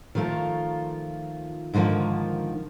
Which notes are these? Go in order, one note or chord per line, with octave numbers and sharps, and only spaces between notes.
D#3 F3 A3 F4 A#4
G#2 D3 D#3 F3 A#3